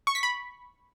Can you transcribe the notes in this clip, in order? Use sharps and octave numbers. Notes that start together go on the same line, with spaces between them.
C#6
B6
B5